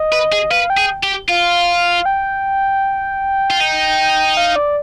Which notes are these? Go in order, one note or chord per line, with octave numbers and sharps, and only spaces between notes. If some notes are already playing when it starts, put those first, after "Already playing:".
Already playing: D#5
B4
G#4
B4 F5
G5
G#4
G4
F4 F5
G5
F4
D#4
F5
D5